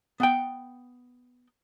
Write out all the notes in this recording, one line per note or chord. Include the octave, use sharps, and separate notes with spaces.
B3 F#5 G5